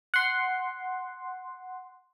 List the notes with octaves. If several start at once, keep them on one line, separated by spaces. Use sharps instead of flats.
F#5 C6